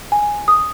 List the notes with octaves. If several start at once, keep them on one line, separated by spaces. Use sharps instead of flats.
G#5
D#6